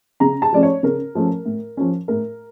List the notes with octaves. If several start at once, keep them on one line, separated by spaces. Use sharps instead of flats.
C#3 A#5
A5
F3 A3 C#4 D5
C#5
C#3 A#4
F3 A3 C#4
A2
F3 C#4
A2 A#4